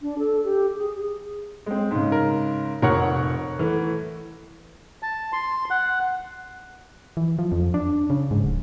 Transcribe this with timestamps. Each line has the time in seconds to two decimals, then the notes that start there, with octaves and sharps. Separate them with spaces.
0.02 D4
0.19 A4
0.44 G4
0.76 G#4
1.66 G#3 C4
1.91 G#2 C#3
2.12 A#4
2.82 F1 A#4 C#5 F#5
3.59 E3 A3
5.02 A5
5.33 C6
5.70 F#5
7.17 E3
7.39 F3
7.52 F2
7.74 D4
8.10 C#3
8.31 G#2
8.44 D1